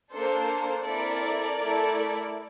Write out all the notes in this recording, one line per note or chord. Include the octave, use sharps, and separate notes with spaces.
A#3 D4 A4 C5
C4 E4 A4 A#4 D5
A3 E4 A4